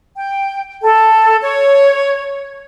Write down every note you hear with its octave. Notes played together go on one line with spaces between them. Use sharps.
G5
A4
C#5